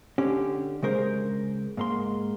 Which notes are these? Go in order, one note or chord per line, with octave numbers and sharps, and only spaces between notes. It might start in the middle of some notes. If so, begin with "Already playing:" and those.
D3 C#4 G4
C#3 G#3 A#4 C5
G#2 A#3 C6